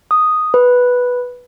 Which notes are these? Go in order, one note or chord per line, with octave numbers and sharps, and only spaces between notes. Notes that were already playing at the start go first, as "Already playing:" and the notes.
D#6
B4